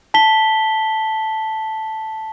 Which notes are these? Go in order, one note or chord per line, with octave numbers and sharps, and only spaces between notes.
A5 B6 G7